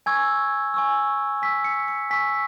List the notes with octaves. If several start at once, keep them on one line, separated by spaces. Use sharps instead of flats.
G#5 C#6 E6 G#6
G#5 C#6 E6
G#5 C#6 E6 B6
C#7
C#7
G#5 C#6 E6 B6